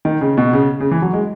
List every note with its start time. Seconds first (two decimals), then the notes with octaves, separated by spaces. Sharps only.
0.05 D#3
0.21 C#3
0.38 B2
0.53 C#3
0.80 C#3
0.91 E3
1.02 F#3
1.13 G#3